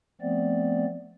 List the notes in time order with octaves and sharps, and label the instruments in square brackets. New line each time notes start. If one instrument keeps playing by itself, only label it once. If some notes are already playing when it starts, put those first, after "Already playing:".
[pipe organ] F3 A3 B3 C4 D5